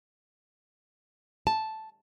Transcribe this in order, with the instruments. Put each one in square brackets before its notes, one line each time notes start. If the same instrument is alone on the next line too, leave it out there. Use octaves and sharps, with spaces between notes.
[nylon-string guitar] A5